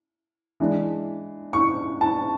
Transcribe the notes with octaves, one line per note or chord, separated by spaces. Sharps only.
E3 G#3 D4
C#6
A5